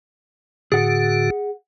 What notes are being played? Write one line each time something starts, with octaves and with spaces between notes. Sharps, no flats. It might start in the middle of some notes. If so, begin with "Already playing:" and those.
A2 D3 F#4 G#4 F#5